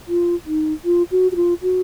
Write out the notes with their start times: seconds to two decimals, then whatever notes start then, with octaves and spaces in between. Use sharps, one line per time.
0.08 F4
0.46 D#4
0.85 F4
1.11 F#4
1.32 F#4
1.36 F4
1.62 F#4